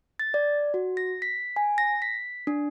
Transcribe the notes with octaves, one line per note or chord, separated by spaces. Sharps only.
A6
D5
F#4
A#6
B6
G#5
A#6
B6
D4